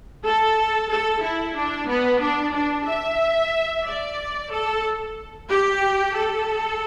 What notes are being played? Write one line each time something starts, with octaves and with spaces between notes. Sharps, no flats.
A4
A4
E4
D4
B3
D4
D4
E5
D5
A4
G4
A4